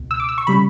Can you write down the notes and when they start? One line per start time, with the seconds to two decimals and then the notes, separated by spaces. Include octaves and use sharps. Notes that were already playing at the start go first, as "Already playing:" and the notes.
Already playing: C#2 B2
0.11 E6
0.20 D6
0.29 E6
0.38 C#6
0.47 C#3 G3 B5